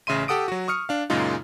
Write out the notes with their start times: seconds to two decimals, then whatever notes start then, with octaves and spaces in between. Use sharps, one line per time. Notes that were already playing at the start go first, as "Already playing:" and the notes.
0.07 A1 C#3 E5 C6 D#7
0.28 G4 A4 F#5 D#6 D7
0.48 F#3 F#4
0.68 C#6 D#6 F6 C#7
0.89 D4 F5
1.10 F#2 A#2 C#3 G#3 D#4 F4